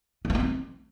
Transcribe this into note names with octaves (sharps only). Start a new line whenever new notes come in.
C#4
B3
A#3
C4